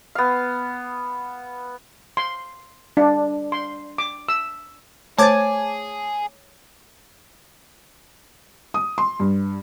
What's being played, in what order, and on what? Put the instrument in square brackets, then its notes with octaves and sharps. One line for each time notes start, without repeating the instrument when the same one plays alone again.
[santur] B3 F5
[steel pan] C6
D4
C6
D6
E6
[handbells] A3 C5 A6 [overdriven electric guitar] G#4 [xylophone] C#5 [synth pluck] A5 D6 G#6
[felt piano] D#6
C6
G2